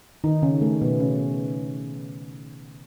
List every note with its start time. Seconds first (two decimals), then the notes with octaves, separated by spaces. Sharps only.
0.24 D#3 D#4
0.42 C#3 C#4
0.61 A3
0.81 B2 B3
1.00 C#3 C#4